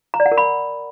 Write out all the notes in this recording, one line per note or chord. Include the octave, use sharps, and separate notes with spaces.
A#5
D5
F#5
A#4
B5